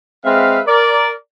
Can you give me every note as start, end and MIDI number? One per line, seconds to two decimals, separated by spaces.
0.24 0.60 56
0.24 0.60 60
0.24 0.60 71
0.24 0.60 76
0.24 0.60 77
0.66 1.11 70
0.66 1.11 74